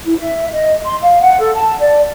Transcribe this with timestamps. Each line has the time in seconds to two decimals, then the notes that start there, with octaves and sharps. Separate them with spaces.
0.04 E4
0.18 E5
0.51 D#5
0.84 C6
1.02 F5
1.21 F#5
1.38 A4
1.54 A5
1.79 D5